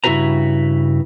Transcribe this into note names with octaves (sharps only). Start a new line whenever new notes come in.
G2 C#3 E4 F#4 B4 A#5